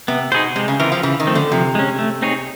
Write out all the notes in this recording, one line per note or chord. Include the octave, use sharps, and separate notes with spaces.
C3 B3
B2 D#4 G#4 C5
C3 G#3
C#3
E3 C4 F4 A#4
F3
C#3 E3
D#3
F3 A3 C4
D3
C3 F3
G#3 C#4
A3
C4 D#4 G#4 C#5